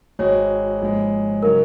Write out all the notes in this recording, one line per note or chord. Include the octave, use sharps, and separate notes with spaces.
G#1 G#2 G#3 F#4 C#5
A#1 G#2 G#3
C#3 F#3 D#4 F#4 A#4